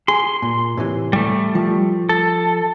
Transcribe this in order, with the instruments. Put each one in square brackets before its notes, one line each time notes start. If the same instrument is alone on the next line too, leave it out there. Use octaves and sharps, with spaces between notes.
[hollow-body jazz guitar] G#4 [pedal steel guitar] C6
[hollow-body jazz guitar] A#2
A2 C3 E3
[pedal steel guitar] G3 A3
[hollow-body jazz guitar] F3
[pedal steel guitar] A4